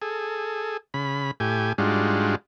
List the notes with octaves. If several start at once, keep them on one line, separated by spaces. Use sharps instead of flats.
G#4 A4
C#3 B5
A2 G4 G#5
G#2 G3 G#3 D4 F4 F#4